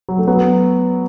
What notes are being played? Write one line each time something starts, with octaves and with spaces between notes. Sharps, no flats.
F#3
A3
F#3 B3